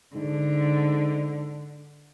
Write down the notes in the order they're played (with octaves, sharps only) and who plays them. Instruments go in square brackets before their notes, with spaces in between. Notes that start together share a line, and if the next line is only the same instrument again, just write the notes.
[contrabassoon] G#2 [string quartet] D3